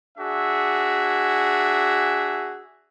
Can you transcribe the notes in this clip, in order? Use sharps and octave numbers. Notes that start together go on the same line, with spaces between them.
D4 F#4 G#4 E5